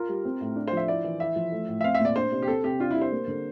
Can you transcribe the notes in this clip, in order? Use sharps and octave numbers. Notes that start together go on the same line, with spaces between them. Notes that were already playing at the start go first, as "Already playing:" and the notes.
Already playing: F4 A#4
G3
C4
A2
D4
C5
F3 E5
E4 D5
E3
E4 E5
F3
A3
A2
E5
C4 F5
E5
A#2
D5
D4 C5
C3
G4
C4 A4
C3 G4
D4 F4
E4
G3
C5
A#3
D3